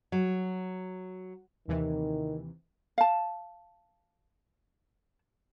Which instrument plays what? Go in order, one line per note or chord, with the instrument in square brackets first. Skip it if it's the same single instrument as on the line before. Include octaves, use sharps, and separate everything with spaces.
[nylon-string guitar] F#3
[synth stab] D#2 C3 E3 [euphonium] D#3
[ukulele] F5 A5